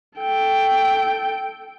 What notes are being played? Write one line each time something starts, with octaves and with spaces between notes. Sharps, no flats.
A4 G5